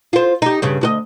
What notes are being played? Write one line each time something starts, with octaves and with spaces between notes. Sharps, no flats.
F4 C5
D#4 G4
G2 C#3
D2 F#4 D#5